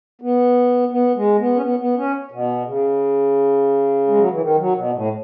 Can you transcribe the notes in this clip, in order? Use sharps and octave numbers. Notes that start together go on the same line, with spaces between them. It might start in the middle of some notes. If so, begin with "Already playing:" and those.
B3
B3
G#3
B3
C#4
B3
B3
C#4
B2
C#3
G#3
F#3
E3
D#3
F#3
B2
A2